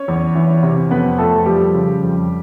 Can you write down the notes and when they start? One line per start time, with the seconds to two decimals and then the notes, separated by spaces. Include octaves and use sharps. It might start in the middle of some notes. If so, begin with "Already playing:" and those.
Already playing: C#4 C#5
0.08 E2
0.35 E3
0.63 C3
0.91 F2 B3 B4
1.18 F2 A3 A4
1.46 F3 G3 G4
1.74 C#3
2.02 F2